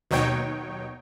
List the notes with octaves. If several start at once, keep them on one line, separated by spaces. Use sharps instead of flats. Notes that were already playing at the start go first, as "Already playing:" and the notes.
D#2 B2 F#3 D#4 C#5 G5